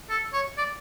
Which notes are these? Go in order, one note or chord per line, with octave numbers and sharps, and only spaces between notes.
A4
C#5
D5